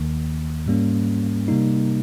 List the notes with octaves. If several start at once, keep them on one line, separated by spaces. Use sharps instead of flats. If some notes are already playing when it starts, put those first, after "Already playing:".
Already playing: D#2 D#3 A#3
G#2 G3 A#3 C#4
C3 G3 A#3 D#4